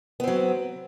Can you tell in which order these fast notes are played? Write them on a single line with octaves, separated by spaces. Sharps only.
B3 C4 F#3